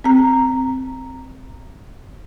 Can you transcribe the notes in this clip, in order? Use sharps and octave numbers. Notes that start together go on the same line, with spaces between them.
C4 A#5